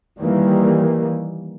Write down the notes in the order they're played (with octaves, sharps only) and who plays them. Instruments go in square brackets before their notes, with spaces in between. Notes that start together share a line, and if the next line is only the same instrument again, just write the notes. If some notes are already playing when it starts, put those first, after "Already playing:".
[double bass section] D#3 E3 G3 A#3